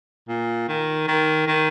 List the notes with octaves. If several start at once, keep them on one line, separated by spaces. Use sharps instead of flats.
A#2
D#3
D#3
D#3